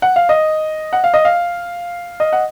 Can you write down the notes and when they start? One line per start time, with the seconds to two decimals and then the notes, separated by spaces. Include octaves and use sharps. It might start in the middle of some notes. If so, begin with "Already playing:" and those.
0.02 F#5
0.16 F5
0.29 D#5
0.93 F#5
1.04 F5
1.14 D#5
1.25 F5
2.20 D#5
2.33 F#5